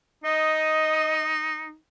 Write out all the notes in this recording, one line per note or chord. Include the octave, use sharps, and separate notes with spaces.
D#4 D#5